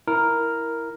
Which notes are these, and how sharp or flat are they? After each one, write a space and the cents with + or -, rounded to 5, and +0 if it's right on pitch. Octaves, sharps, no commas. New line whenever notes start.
E4 +0 A#4 +0